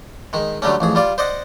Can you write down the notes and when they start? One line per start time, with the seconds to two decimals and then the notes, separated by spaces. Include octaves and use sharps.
0.33 D#3 G#3
0.62 D3 F#3 G3 A3 C#4
0.80 A1 F2 G#4
0.95 G3 F4 D5
1.18 C5 D5 D#5 F#5